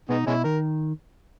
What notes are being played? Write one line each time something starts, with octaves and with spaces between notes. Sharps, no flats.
B2 G#3 B3 D#4
B2 G#3 C#4 E4
D#3 A#4